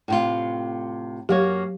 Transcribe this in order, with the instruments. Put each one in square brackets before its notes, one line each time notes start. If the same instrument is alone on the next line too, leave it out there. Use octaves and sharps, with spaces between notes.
[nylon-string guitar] A2 C3 F4
[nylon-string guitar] F#2 A#3 C#5 [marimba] F#3 G4